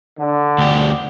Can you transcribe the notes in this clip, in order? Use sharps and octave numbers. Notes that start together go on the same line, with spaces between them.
D3
D2 G4